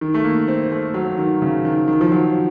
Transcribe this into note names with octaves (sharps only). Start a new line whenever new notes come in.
D#3
A3
A#3
C4
A3
F#3
D#3
C#3
D#3
D#3
F3
F#3